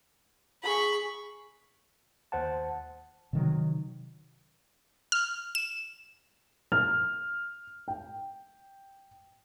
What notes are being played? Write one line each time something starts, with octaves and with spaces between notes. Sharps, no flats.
G#4 B5 C#6
D#2 C5 F#5 A5
C3 D#3 F#3
F6
E7
F6
G5